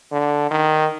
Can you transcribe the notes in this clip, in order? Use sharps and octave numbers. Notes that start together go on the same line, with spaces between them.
D3
D#3